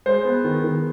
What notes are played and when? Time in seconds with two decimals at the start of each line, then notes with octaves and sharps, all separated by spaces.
0.06 G#3 C5
0.25 B3
0.44 D#3
0.64 D#3